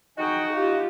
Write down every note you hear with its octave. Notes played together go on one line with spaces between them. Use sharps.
D#4 F#4 G#4 G5
F4 G4